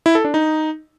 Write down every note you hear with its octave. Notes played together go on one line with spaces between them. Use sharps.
E4
A4
D4
D#4